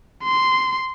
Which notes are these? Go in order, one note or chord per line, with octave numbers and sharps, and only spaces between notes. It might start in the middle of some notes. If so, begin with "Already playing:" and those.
C6